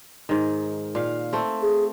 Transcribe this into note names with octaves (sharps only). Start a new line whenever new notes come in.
G#2 D#3
A#2 F5
A3 C4
G#4